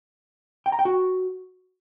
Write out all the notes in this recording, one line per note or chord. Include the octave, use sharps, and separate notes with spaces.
G5
A#5
G5
F#4